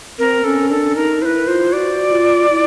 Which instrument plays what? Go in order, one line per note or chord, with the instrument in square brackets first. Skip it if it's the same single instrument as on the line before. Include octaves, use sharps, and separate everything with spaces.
[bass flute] C4 [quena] A#4
[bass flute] C#4 [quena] A4
[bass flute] D4 [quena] A4
[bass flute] D#4 [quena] A#4
[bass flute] E4 [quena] C5
[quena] B4
[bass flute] F4 [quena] C5
[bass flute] F#4 [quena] D5
[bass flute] F4
E4